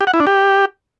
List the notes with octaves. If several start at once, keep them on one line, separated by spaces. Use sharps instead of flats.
G4
F#5
E4
D4
G4